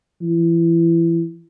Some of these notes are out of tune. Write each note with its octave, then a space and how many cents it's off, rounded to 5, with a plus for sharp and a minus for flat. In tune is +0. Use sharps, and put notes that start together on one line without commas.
E3 +25